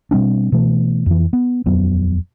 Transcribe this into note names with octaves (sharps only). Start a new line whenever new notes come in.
B2 G3 C4 D4
B2 E3 A3
F2 E3
B3
D#1 F2 F#3 B3